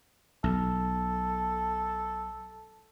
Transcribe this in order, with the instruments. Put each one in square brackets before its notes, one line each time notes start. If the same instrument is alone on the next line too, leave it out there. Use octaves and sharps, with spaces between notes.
[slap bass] B1 [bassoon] A4